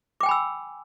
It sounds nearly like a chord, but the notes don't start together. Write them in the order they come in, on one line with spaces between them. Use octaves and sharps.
D6 G5 G#5 B5 E6